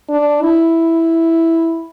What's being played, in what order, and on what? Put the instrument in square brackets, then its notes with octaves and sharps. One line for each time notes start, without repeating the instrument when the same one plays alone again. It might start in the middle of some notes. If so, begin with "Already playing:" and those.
[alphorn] D4
E4